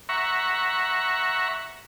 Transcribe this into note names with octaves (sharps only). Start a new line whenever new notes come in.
E5 F#5 A#5 C#6